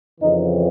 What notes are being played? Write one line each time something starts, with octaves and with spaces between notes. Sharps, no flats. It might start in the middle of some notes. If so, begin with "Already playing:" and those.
F2 C#3 E3 D#4